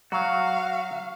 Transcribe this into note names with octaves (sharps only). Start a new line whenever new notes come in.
F#3 F#4 F5